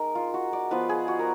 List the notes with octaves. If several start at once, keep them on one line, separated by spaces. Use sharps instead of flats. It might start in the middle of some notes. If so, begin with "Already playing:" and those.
Already playing: G#3 D#4 A#4
F4
F#4
D5
F3 B3 F4 B4
G#4
F#4
A#4